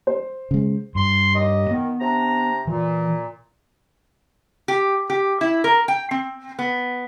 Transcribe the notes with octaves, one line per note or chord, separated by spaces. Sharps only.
C5
C#3 G#3
G2 C6
D#2 G4 D#5
D#3 B3
C3 D4 A#5
A#2 E3
G4
G4
E4
A#4
G5
C4
B3